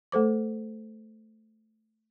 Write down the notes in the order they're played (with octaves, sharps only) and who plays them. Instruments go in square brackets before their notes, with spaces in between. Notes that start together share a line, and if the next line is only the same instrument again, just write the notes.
[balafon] A3 A4 C5 D6